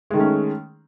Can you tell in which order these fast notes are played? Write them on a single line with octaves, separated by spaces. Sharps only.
G#3 D#3 A3 C#4